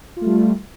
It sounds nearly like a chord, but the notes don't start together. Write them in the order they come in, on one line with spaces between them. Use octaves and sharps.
F4 A3 G3